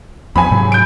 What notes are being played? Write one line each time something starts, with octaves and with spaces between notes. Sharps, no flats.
E2 F3 G#5 B5
G#2 C3 F#3
G6 D7